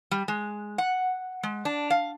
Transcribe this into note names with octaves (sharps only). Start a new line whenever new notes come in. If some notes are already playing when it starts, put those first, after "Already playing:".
G3
G#3
F#5
G#3
D4
F5